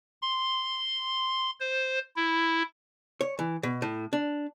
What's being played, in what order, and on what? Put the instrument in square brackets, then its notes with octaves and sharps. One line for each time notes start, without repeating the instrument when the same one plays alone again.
[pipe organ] C6
C5
E4
[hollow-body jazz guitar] C#5
E3
B2
A2
D4